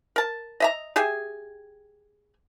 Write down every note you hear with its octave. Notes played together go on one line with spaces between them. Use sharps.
A#4 A5
D#5 E5 A#5
G4 G#4 E5 G#5